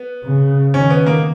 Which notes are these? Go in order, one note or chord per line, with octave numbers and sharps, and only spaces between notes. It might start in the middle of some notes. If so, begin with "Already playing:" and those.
Already playing: B3
C#3
D#3 C#4
B3
A#3